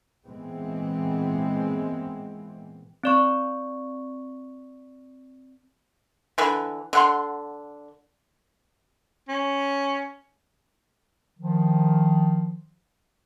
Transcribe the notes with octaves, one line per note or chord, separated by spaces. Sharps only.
A#2 E3 G#3 B3 C4
C4 D5 C#6
D3 E3 B4
D3 F#5 C6
C#4
D#3 F3